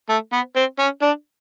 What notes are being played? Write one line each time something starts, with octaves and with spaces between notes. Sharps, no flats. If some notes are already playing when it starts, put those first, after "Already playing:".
A3
B3
C4
C#4
D4